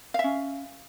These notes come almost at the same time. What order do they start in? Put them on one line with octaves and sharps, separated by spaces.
F5 E5 C#4